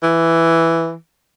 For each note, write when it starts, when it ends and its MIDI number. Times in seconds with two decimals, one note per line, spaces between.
0.03 0.95 52